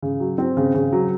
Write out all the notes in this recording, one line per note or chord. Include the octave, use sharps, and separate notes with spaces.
C#3
F#3
C4
C#3
C#3
F#3